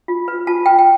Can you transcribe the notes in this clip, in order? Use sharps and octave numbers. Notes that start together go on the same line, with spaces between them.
F4
B4
F4 A5
B4 G5
G5